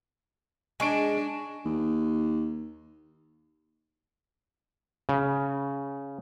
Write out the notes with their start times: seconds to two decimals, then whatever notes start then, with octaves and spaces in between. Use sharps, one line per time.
0.80 G#3 D4 G#5 C#6 D7
1.65 D#2
5.09 C#3